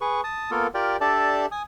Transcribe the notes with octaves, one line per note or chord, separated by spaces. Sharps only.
G#4 B4 C#6
A5 D#6
A#3 B3 F4 A4 A#4
F4 G4 A#4 D5 G5
D4 G4 A4 D5 E5 A5
G#5 D#6